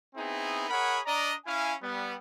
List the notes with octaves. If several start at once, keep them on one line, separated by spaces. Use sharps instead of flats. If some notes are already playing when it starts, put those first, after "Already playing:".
B3 C4 D#4 E4 G#4
G#4 A#4 C#5 F#5 B5
D4 D5 D#5 A#5
C#4 E4 F5 G#5
G3 B3